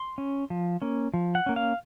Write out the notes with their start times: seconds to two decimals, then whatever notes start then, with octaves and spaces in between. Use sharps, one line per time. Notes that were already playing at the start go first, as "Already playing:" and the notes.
Already playing: C6
0.18 C#4
0.50 F3
0.82 A#3 C#4
1.14 F3
1.35 F#5
1.46 A#3 C#4
1.56 F5